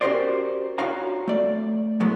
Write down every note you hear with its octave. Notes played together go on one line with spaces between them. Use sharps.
C#4 F#4 G4 A#4 C5 D5
D4 F4 F#4 C#5 F5 A#5
A3 D5
A2 F#3 G#3 B3